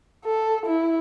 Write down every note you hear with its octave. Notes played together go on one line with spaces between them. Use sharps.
A4
E4